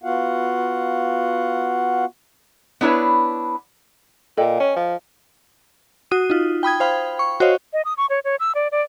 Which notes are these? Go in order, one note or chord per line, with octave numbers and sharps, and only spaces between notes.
B3 F4 F#4 F5 F#5
B3 D4 E4 B4 C#5
A#2 A4 D#5 G5
C#4
F3
F#4 D#6 D#7
D#4 F4
G5 B5 D#6 G#6
C5 F5 G5 B5
C#6
F#4 C5 C#5 D#5 F5
D#5
D#6
C#6
C#5
C#5
E6
D5
D5